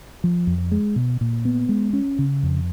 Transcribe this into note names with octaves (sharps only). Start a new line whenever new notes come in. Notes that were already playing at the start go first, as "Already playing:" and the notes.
F3
F2
G#3
B2
A#2
B3
G#3
C#4
C#3
F2